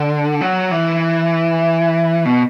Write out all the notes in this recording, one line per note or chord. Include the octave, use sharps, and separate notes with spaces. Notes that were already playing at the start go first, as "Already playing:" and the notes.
Already playing: D3
F#3
E3
B2